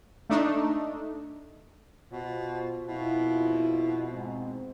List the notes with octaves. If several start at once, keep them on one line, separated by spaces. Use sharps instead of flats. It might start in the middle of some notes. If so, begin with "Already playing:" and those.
A3 D4 D#4
B2 F4 C5
F2 B2 E4 F4
G#2 C4